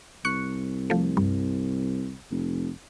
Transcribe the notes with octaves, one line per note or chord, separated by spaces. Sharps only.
C2 C#6 F#6 C#7
F3 A3
G2
F1